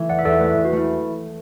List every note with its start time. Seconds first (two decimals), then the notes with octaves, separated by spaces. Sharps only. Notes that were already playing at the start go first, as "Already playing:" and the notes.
Already playing: E3 A3
0.09 E2 D5 F#5
0.19 E5
0.25 E2 A4 D5
0.40 A3 B4 E5
0.57 E2
0.65 F#4
0.73 A3 E4